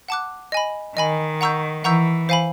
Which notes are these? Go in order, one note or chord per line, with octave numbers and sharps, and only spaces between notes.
F#5 A5 D6 F#6
D#5 G#5 B5
D#3 D#5 G#5 B5
F#5 A#5 C#6 E6 G6
E3 F#5 A#5 C#6 E6 G6
C5 F5 G#5 B5